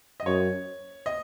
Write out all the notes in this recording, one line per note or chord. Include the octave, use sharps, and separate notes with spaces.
D#5
F#2 C#5
D#5